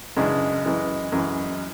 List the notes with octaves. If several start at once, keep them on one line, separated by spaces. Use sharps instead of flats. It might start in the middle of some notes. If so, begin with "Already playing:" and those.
F#2 C#3 E3 G#3 D4
F#2 E3 G#3
F#2 E3 G#3